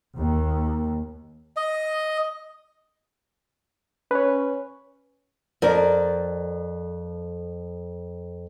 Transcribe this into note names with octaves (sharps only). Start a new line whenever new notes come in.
D#2
D#5
C#4 B4 C#5
F2 A#4 D5